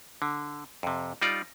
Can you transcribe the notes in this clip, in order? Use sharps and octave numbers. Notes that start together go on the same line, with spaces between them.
D3
F2 C3
G3 D#4 F4 D5